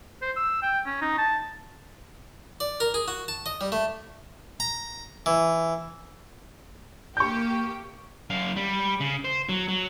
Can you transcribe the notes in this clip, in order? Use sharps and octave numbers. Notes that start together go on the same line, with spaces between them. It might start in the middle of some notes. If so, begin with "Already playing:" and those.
C5
E6
G5
C#4
D#4
A5
D5
A#4
G#4
F#4
A5
D#5
G3
A3
A#5
E3
A#3 G4 C#6 G6
F#2 F5
G3
C#3
C5
F#3
F#3